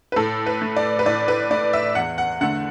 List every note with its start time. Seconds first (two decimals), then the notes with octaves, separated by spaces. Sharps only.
0.12 B4
0.16 A2 A4
0.46 B4
0.62 A3
0.76 D5
0.99 B4
1.06 A2 D5
1.28 B4
1.51 A3 D5
1.73 E5
1.95 E2 F#5
2.18 F#5
2.41 D3 A3 F#5